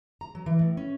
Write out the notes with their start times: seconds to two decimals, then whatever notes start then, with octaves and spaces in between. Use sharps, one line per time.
0.21 A#5
0.35 F#3
0.46 E3
0.59 A2
0.77 C#4